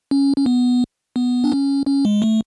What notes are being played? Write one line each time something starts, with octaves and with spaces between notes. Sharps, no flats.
C#4
C#4
B3
B3
D4
C#4
C#4
G#3
A3